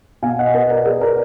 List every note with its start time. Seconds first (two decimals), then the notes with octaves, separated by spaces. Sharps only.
0.22 B2 F5 G#5
0.39 D#5 F#5
0.55 B4 D#5
0.70 A#4 D5
0.86 G#4 B4
1.01 A#4 D5